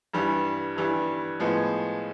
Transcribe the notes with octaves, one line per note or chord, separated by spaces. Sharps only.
G2 E3 G3
G2 E3 G3
A2 F3 G#3 B3